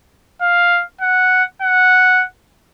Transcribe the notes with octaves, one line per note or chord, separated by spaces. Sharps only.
F5
F#5
F#5